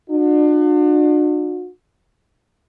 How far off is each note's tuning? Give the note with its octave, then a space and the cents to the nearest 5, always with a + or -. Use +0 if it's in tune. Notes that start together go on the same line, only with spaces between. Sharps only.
D4 +40 F#4 -40